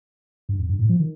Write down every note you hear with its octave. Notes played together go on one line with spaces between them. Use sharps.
G2
F2
G2
A2
F3
D#3